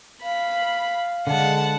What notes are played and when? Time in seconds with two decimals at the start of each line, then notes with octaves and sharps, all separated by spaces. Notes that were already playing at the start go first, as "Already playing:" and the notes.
0.23 F5 B5
1.27 D3 G#3 F#5 A5